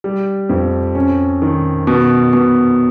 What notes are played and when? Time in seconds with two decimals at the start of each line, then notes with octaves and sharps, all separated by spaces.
0.04 G3
0.49 F2
0.95 C#4
1.42 D#3
1.87 B2
2.33 B2